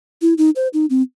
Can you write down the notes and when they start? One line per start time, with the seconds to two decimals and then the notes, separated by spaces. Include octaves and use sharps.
0.22 E4
0.38 D#4
0.56 C5
0.74 D#4
0.90 C4